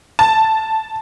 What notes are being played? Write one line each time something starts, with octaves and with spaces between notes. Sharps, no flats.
A5